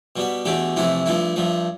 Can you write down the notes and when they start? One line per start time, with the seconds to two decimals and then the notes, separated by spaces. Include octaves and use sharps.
0.16 B2 G3 B3
0.45 E2 B2 A3 D4 G4
0.76 F2 C3 E3 A3 E4
1.06 G2 F3 A3 E4
1.36 G2 F3 A3